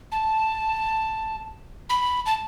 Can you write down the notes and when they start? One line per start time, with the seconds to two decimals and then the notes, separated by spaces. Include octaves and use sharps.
0.12 A5
1.90 B5
2.26 A5